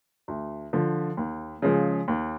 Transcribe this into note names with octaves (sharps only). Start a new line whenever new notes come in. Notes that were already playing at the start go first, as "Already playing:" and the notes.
D2
D3 F3
D#2
C#3 F3 G#3
D#2